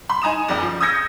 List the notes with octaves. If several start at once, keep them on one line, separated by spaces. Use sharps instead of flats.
B5 C6
D#4 G#5 A#5 D#6 E7
F#1 F2 D5 G5
F3
D#6 E6 G6 G#6 A#6 C#7